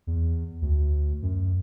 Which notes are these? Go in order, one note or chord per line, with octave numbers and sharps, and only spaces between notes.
E2
D2
F#2